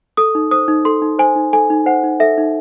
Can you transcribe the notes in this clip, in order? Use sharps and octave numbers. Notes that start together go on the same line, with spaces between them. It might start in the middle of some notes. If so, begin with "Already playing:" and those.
A4 D#6
D#4
C5 D#6
D#4
A4 C6
D#4
C5 G#5
D#4
A4 G#5
D#4
C5 F#5
D#4
A4 E5
D#4